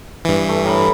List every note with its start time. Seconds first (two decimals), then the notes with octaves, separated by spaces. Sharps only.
0.25 G2 E3
0.48 A3
0.64 A2 A#4 B5